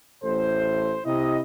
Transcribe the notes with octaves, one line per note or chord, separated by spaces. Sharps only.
A1 A2 A4 C5
C3 E4 D#5